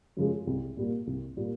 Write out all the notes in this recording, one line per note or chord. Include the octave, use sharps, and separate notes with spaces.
F#2 C#3 F3 G#3
C2
A#2 G3 A#3
C2
A#2 G3 A#3